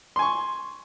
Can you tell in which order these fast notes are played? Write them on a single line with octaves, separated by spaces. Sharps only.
C6 G#5 C#6